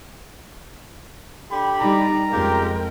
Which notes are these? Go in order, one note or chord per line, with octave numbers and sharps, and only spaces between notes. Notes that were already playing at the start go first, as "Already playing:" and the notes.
D3 G4 B5
G3 D#4 D5 A#5
F2 C#3 G#3 F4 G4 A#4 G5